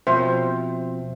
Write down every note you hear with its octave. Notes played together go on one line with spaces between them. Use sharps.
B2 F3 C4 C5 E5